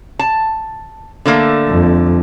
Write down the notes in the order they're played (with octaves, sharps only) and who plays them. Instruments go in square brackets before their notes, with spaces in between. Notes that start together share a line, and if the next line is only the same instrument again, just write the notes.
[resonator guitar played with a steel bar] A5
D3 A3 A#3
[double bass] F2